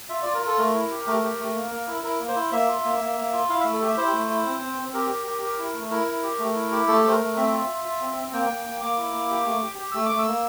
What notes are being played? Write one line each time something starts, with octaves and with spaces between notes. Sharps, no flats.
F4 E5
F4 D5
A#4
F4 A4
A3 A#4
E4
G4
A3 A#4
G4
A3
A#3
A#3
E4
E4 A#4
A#3
C5
E4
A#3 E5
F4
A#3
A#3
A#3
F4
E4 F5
A3 E5
A4
G4 E5
E4 C5
A3
E4
C4
C4
C4
G4 A#4
G4
G4
G4
E4
A3
E4 A#4
E4
G4
A3
E4
G4
A3 A4
A3 C5
A#4
A3
C4 E5
F4
F4
F4
C4
C4
A#3 G5
A#3
A#3
A#3 D6
E4
A#3
G4
A3
G4
G4
A3 E6
D6
A3
E6
A#3